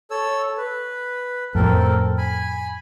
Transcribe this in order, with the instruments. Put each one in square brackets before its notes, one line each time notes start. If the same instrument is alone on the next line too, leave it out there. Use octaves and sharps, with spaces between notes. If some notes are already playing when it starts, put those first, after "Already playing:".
[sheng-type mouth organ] A4 C#5 E6
B4
[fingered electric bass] F2 A2 [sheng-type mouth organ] C4 A4 A#4
[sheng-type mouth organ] G#5 B5